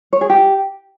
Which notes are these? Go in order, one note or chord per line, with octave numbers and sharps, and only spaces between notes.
C#5
G#4
G4